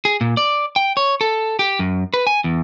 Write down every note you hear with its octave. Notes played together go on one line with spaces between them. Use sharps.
G#4
A#2
D5
G5
C#5
A4
G4
F#2
B4
G#5
E2